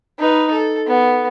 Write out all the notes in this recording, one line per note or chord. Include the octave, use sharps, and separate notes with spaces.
D#4 B4
A4
B3